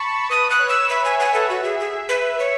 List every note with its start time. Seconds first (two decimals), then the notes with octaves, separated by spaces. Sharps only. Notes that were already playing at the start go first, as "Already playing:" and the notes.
Already playing: A5 B5 C#6
0.29 B4 D#6
0.50 F#6
0.59 C#5
0.69 E6
0.89 E5 B5
1.05 G#5
1.20 F#5 G#5
1.34 A4
1.49 F#4 E5
1.64 G#4
1.80 G#4
2.09 B4
2.39 C#5